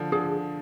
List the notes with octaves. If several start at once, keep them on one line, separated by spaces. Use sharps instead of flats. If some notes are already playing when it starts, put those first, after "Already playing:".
Already playing: D3 F3
D3 F3 G#4